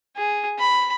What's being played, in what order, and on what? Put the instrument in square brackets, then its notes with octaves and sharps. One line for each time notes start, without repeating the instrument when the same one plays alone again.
[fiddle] G#4
B5